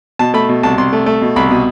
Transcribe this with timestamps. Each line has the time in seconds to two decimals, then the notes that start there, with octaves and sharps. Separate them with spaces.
0.19 B2 A5
0.34 A3 B5
0.49 B2
0.63 C2 A5
0.78 C2 C6
0.93 A3
1.06 A3
1.21 B2
1.36 C2 B5
1.51 B2